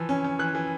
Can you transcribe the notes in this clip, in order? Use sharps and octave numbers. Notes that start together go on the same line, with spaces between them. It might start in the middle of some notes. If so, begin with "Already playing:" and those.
Already playing: E3 F3
C#4
C#4
E3 F#6
E3